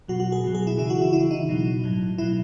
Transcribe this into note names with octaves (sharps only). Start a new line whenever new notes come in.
B2 F#3 F#4
F#4
G#4
B2 F#3
G#4
E4
C#3 E3 E4
F#4
E4
C#3 E3 E4
D#4
B2 F#3
A2 F#3
B2 F#3 E4